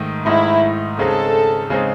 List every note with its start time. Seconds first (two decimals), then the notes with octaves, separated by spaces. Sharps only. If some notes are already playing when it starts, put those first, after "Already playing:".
Already playing: G#2 D#3 A3 D#4
0.26 G#2 D#3 A3 D#4 E4
0.99 C#3 G#3 C4 D#4 A4
1.70 C#3 G#3 C4 D#4